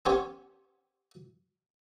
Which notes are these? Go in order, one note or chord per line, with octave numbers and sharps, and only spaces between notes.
B3 C#4 G4 C5 C#5 G#5